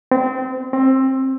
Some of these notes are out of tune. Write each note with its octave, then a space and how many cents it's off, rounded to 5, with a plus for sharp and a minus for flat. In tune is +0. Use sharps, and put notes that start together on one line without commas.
C4 -25
C4 +20